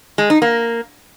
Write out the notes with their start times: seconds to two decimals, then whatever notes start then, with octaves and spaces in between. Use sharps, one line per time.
0.18 G#3
0.30 D#4
0.42 A#3